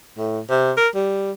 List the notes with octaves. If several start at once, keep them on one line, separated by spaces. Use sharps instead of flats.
A2
C3
A#4
G3